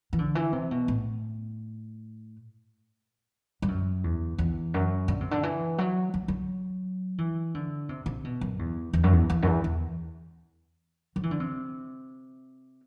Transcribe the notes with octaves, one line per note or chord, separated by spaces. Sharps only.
E3
D3
E3
C3
B2
A2
G2
F#2
E2
E2
F#2
D3
C3
D3
E3
F#3
F#3
F#3
E3
D3
C3
C3
B2
F#2
E2
E2
F#2
E2
E2
F#2
E2
E2
F#3
E3
D3
C3